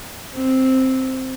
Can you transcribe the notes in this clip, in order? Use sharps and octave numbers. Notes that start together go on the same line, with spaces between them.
C4